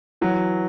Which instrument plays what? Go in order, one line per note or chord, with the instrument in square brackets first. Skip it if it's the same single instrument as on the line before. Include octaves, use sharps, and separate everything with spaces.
[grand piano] E3 F#3